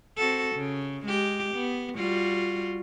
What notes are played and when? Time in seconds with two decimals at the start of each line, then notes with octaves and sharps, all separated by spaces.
0.17 C4 F#4 A4
0.56 C#3
1.05 G#3 G4
1.54 B3
1.95 G3 F4 F#4